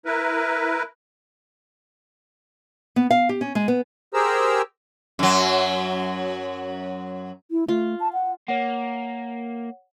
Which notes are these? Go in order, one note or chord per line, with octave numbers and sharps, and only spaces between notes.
E4 A#4 B4
B3
F5
G4
C#4
G#3
B3
G4 G#4 A#4 C5 A#5 E6
F#2 F#3
E4
A3 F4
A5
F#5
A#3 C#5 F#5